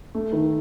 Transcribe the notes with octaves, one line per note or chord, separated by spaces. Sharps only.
A3
D#3